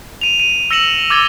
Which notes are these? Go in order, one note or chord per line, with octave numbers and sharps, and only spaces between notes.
D#7 F7
D#7
E6 A#6 C#7 E7 F#7
D6 E6 G#6 A6 G7